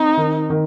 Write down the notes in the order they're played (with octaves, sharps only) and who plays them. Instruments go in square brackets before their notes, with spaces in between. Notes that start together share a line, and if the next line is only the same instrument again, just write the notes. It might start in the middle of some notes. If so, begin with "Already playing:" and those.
Already playing: [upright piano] C4 [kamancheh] D#4
[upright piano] D#3
D#3